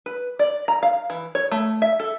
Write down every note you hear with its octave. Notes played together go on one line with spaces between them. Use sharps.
B4
D5
A#5
F5
E3
C#5
A3
E5
A4